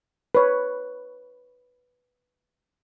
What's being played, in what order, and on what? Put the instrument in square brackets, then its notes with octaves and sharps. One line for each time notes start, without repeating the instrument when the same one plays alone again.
[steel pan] B4 C#5